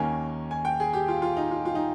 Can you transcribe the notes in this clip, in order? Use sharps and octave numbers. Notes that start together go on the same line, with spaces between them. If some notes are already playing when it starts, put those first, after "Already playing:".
Already playing: D#2 D#3 A#3 C#4 G#5
G#5
G5
G#4
G4
F4
F4
D#4
F4
F4
D#4